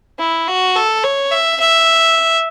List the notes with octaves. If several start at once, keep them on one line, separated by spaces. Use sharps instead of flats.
E4
F#4
A4
C#5
E5
E5